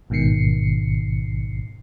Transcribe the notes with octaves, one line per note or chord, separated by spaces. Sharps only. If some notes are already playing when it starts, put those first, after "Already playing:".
A1 G#2 B2 D#3 C7 C#7